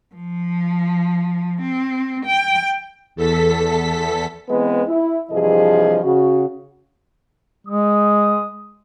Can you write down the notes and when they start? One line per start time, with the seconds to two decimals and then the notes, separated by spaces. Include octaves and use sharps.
0.15 F3
1.62 C4
2.26 G5
3.15 E2 A4 B6
4.49 E3 G#3 B3 C4 B4
4.87 E4
5.30 G2 C3 E3 F3 G#4 D#5
6.03 C#3 F#4
7.67 G#3 D#6